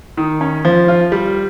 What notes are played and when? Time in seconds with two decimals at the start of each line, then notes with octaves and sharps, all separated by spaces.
0.17 D#3
0.41 C#4
0.65 F3
0.88 F4
1.12 G3